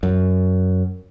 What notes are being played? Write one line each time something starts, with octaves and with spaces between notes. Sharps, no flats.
F#2